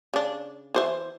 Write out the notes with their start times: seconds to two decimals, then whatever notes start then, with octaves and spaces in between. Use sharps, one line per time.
0.14 C#3 D4
0.74 E3 C5 E5